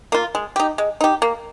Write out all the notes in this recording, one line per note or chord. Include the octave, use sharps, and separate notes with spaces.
A#3 F4
G#3
D#4 G4
G#3
D#4 G4
A#3